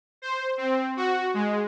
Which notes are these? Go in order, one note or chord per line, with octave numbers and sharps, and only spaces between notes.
C5
C4
F#4
G#3